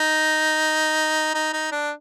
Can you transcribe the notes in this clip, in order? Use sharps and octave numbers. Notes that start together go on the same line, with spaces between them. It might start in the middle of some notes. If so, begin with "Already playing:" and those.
Already playing: D#4
D#4
D#4
D4